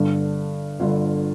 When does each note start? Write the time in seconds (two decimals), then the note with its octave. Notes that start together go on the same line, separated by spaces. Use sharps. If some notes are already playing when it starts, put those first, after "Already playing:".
Already playing: G1 G2 D3 D4
0.80 G1 G2 D3 F4